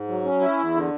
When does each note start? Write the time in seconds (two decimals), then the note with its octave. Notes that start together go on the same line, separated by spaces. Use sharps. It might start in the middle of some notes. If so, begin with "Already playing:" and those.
Already playing: G#2
0.08 F#3
0.24 C#4
0.41 E4
0.58 E2
0.74 D3